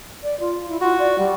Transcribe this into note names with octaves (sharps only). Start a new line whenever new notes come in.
D5
F4
E4
F4 F#4
D5
G3